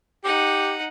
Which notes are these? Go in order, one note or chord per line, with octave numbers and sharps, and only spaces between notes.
D#4 G4 F#5